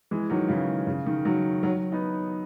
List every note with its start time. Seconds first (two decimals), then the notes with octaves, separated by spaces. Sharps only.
0.11 E3 G#3
0.30 D#3 F#3
0.49 C#3 E3
0.87 C#3
1.06 D#3
1.25 D#3 F#3
1.63 D#3 F#3
1.92 B3 D#4